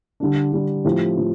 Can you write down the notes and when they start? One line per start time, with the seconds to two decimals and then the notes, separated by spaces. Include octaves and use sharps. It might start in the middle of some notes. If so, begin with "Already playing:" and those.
0.20 D3 G3 D4
0.53 D3 G3 D4
0.85 A2 F3 C4 G4
1.17 A2 F3